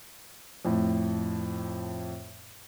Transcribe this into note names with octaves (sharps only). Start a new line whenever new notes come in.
F2 A2